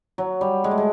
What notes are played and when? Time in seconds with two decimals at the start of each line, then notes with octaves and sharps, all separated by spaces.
0.18 F#3
0.41 G3
0.64 G#3
0.71 A3
0.78 G#3